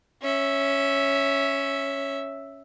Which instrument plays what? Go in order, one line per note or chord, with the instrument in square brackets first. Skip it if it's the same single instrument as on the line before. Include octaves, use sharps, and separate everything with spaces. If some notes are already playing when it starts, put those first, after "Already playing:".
[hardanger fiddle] C#4 E5